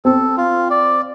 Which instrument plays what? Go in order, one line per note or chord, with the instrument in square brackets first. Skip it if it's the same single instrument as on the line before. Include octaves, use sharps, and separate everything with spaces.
[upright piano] C4 [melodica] A4
[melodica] F4
D5